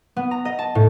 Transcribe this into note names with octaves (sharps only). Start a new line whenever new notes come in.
B3
A#5
D#5
A5
A2